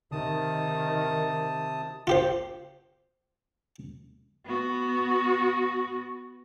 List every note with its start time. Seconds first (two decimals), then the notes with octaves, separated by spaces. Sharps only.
0.12 C3 D#3 A5 D#6
2.07 F4 G4 C5
4.46 B3 F#4